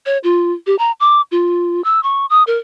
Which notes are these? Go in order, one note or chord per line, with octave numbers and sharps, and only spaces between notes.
C#5
F4
G4
A#5
D6
F4
E6
C#6
D#6
A#4